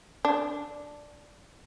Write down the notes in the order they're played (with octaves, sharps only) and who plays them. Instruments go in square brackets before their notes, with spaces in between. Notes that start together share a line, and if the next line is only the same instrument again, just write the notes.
[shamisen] D4